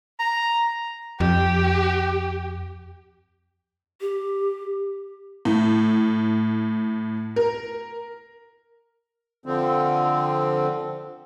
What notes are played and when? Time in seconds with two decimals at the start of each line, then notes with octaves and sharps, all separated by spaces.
0.20 A#5
1.20 F2 G4
4.01 G4
5.45 A2
7.36 A#4
9.46 D3 F3 C4